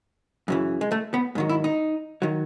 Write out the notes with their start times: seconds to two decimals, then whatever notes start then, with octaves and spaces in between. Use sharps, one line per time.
0.48 F#2 C#3 E3
0.81 G#3
0.92 A3
1.14 B3
1.35 G#2 D#3 F#3
1.49 E4
1.64 D#4
2.22 D#3 F#3